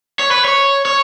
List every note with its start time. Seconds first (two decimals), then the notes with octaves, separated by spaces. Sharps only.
0.20 C#5
0.31 B4
0.45 C#5
0.86 C#5